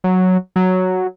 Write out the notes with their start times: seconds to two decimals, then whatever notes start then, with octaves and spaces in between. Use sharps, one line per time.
0.04 F#3
0.56 F#3